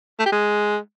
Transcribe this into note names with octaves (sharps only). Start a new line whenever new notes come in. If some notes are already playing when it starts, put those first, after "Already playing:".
A3
G4
G#3